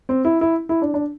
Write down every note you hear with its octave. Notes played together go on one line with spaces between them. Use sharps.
C4
E4
E4
E4
D4
D4